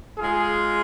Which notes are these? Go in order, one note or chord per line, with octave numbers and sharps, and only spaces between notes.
G#3 F4 G#4